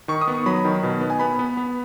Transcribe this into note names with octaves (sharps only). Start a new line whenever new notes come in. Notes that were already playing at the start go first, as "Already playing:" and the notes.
D#3 C#6
D#6
B3
C#6
F#3 B5
D#3
B2
B3
G#5
B3 B5
B3
B3